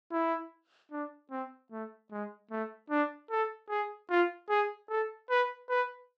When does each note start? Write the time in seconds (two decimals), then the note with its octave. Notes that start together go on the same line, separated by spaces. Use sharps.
0.12 E4
0.92 D4
1.31 C4
1.72 A3
2.11 G#3
2.51 A3
2.90 D4
3.31 A4
3.70 G#4
4.10 F4
4.49 G#4
4.90 A4
5.30 B4
5.69 B4